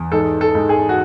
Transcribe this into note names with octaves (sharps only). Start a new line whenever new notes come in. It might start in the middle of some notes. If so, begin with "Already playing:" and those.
Already playing: E2
G#2 A4
A4
G#2
G#4
F#4